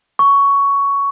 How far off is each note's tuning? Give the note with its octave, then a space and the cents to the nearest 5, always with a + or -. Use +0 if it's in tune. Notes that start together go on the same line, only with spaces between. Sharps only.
C#6 +10